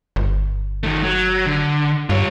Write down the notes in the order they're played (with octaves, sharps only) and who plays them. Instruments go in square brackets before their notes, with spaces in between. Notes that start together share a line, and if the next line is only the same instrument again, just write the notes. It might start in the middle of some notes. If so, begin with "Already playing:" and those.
[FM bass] G1
[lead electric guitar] D#3 A3
F#3
D3
[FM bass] G2 [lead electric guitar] F4 C#5